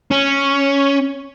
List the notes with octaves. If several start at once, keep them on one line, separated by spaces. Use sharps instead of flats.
C#4